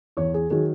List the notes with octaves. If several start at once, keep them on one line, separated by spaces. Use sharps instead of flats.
E2 C#5
G#4
D#3 F#3 G#4